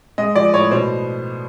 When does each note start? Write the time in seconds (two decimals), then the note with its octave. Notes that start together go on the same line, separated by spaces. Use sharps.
0.18 G#3 D#5
0.35 F3 D5
0.53 A2 C#5
0.71 B2 C5